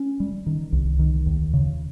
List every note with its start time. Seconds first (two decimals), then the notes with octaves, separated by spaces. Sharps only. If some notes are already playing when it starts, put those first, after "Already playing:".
Already playing: C#4
0.20 G3
0.47 D#3
0.72 C2
0.99 D#3
1.26 D#2
1.54 C#3